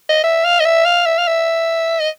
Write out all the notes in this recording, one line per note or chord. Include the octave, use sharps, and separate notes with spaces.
D#5
E5
F5
D#5
E5
F5
E5
F5
E5
D#5